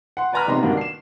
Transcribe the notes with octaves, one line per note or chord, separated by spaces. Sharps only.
F#5 C6
B4 D5 G#5 A#5 B5 F6
A#1 C3 B3 D#4 A#5 C6
G2 D#3 A#3 D4 F#4
C7 E7